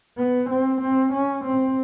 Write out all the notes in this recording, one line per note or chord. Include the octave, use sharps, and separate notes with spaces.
B3
C4
C4
C#4
C4